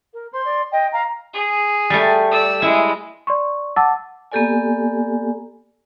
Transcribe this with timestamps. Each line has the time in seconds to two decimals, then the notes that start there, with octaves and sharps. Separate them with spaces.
0.14 A#4
0.33 C5 C6
0.45 D5
0.72 D#5 G5
0.93 F5 A#5
1.33 G#4
1.90 G3 A3
2.31 D5 E6
2.62 G#3 E4
3.27 D5 C6 C#6
3.76 F#5 A5 D6 E6 A6
4.32 A#3 B3 G4 A4 D5 G#5